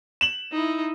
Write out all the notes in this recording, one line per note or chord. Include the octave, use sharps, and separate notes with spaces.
E7 F#7
D#4 E4